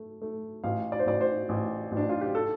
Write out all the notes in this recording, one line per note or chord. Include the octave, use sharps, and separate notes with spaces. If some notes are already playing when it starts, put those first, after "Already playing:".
Already playing: A3
A3
A1 F5
D5
C5
A1 D5
C5
A1
A1
D4
F4
G4
A4